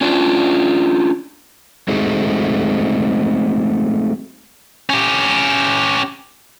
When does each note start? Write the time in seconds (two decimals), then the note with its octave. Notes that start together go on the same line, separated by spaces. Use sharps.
0.01 C#4 D4 F4 D5
1.88 G#3 A3 C4 D#4 F#4 G#4
4.90 C#4 G4